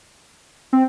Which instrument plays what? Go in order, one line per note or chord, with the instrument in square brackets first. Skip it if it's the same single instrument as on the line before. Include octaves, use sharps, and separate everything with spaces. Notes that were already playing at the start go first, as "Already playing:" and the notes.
[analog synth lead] C4